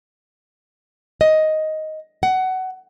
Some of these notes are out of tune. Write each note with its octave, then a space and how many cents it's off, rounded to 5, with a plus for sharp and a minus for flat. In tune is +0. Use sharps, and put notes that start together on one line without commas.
D#5 +5
F#5 +20